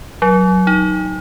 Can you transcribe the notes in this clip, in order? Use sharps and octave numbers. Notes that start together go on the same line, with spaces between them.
F#3
D#4